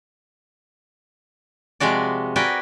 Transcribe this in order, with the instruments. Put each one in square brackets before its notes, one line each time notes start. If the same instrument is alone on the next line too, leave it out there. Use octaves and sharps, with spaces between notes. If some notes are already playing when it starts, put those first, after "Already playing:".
[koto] C3 F3 G#3 F#4 D5
F#4 A#4 B4 D5 G5 G#5